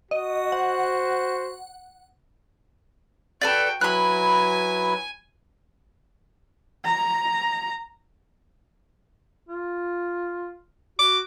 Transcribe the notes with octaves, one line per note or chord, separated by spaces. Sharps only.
F#4 D#5
C5 F#5
F#4 A4 B4 D5 G5
F#3 E4 B4 G#5 B5 F#6
A#5
F4
F#4 D6